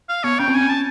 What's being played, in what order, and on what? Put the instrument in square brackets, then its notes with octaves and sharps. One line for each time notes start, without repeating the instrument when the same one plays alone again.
[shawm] F5
[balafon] B3 [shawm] C#5
[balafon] C#4 [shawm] G5
[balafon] C4
[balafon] C#4 [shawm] G#5
[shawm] A5